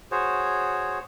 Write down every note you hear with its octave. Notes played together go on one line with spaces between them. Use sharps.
F#4 G#4 C5 C#5